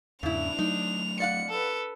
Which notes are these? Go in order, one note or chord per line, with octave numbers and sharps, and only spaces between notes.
E2 G#2 C#3 D4 E4 F7
F#3 A3 D#4
D5 F5 F#5 C#7
A4 B4